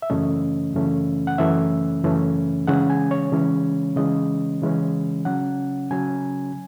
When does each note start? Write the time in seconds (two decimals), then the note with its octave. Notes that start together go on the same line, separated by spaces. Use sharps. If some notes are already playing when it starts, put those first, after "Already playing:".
0.02 E5
0.10 F#2 C#3 E3 A3 C#4 D#5
0.74 F#2 C#3 E3 A3 C#4
1.27 F#5
1.38 F#2 C#3 E3 A3 C#4 E5
2.03 F#2 C#3 E3 A3 C#4
2.67 C#3 E3 G#3 C#4 F#5
2.90 G#5
3.11 C#5
3.32 C#3 E3 G#3 C#4
3.96 C#3 E3 G#3 C#4 D#5
4.62 C#3 E3 G#3 C#4
5.25 C#3 F#3 C#4 F#5
5.91 C#3 F#3 C#4 G#5